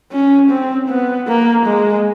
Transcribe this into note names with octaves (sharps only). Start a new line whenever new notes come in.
C#4
C4
B3
A#3
G#3